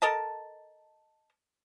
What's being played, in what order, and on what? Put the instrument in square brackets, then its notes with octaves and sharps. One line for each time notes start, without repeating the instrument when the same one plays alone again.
[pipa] A4 A#4 D#5 A5